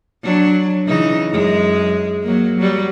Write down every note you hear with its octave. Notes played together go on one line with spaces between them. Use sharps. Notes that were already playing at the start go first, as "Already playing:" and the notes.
F#3 D4
C#3 E3 D#4
F#2 G#3
F#3 A#3
F#3 G3